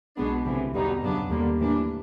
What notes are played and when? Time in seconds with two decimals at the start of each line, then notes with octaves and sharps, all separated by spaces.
0.17 B1 B2 G#3 B3 D4
0.45 D2 C3 E3 G3
0.73 E2 B2 G3 B3 D#4
1.01 F#2 C#3 F#3 B3 D4
1.29 D#2 D3 G3 A#3
1.58 A2 E3 G3 A#3 D4